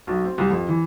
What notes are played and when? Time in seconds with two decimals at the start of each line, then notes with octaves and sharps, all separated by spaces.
0.07 B1
0.24 C4
0.38 C2
0.50 F2
0.68 E3